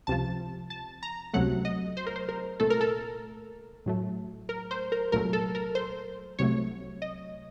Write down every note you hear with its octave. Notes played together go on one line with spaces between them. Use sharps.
C#2 C3 F3 A5
A5
A#5
C#2 C3 F#3 A3 F#5
D#5
C5
A#4
C5
A#4
C2 A#2 A3 A4
A#4
A4
A2 F#3 A3
A#4
C5
A#4
C2 A#2 F#3 A3 A#4
A4
A#4
C5
C2 C3 F#3 A3 C#5
D#5